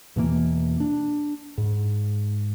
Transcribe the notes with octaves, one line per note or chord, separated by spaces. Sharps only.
E2 B2 E3 A#3
D4
G#2